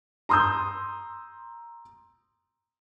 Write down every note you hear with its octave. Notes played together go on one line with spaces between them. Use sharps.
A#5 C6 D#6 E6 G6